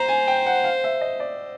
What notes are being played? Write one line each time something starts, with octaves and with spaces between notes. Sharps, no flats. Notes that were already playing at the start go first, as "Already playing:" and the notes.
Already playing: C5 A#5
G#5
G5
F#5
F5
E5
D#5
D5